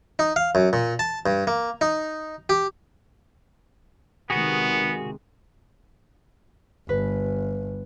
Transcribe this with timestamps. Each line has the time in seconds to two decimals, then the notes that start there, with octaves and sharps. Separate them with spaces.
0.19 D#4
0.36 F5
0.55 F#2
0.73 A#2
0.99 A5
1.26 G2
1.47 A#3
1.81 D#4
2.49 G4
4.30 C3 D#3 G#3 B3 F#4 G#4
6.89 G1 B4